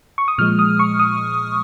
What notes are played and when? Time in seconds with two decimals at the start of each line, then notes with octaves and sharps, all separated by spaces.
0.18 C#6
0.28 D#6
0.38 A#2 F3 G#3 F6
0.59 D#6
0.79 C#6
1.00 D#6